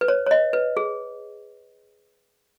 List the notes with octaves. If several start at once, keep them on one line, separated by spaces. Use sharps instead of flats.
B4
C#5
C#5
D#5
B4
G#4